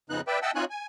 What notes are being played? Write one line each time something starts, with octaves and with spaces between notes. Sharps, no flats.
F2 C#3 B3 D#4 F#6
B4 D5 E5 G5
D#5 E5 F#5 G5 A5 E6
C4 D#4 F4 C#5 G#5 F#6
G#5